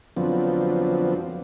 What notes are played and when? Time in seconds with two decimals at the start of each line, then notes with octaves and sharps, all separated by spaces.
0.17 F2 D3 F3 F#3 B3 C4